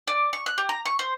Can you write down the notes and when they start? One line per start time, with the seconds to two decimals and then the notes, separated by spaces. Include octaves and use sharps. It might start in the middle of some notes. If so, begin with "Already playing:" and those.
0.08 D5
0.33 C#6
0.46 F#6
0.58 G4
0.69 A#5
0.85 C#6
0.99 C5